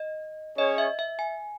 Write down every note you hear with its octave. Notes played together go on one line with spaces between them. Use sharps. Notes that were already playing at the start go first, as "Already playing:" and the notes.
Already playing: D#5
C#4 G#4 C#5 D#5
E5
E5
G#5